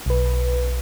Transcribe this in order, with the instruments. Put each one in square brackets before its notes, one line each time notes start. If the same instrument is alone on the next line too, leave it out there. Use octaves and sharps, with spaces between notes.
[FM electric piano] B1 B4